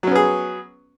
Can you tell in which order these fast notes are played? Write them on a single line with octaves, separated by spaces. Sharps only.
F#3 C#4 B3 G#4